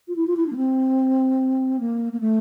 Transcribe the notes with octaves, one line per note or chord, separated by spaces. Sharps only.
F4
E4
F4
E4
D4
A#3
C4
A#3
A#3
A3